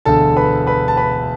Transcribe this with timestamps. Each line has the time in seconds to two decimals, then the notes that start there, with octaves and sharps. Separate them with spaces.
0.05 E1 D2 D3 A4 A5
0.37 B4 B5
0.67 B4 B5
0.88 A5
0.97 B4 B5